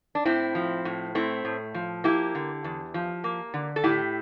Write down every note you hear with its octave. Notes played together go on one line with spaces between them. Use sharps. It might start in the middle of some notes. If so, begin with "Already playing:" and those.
D4
A2 C4 E4
F3
A2
A3 C4 E4
A2
F3
A#3 E4 G4
D3
E2
F3
A#3
D3
A4
A2 E4 G4